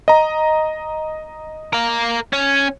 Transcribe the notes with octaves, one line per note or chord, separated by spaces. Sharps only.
D#5 A#5
A#4 F5
C#4